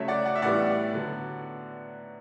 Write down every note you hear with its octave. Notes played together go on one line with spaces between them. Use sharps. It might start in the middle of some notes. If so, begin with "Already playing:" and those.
Already playing: C#3 F#3 A3 C#5 E5
D5 F#5
D5 F#5
E5
A2 E3 G3 B3 D5 F#5
D3 F#3 B3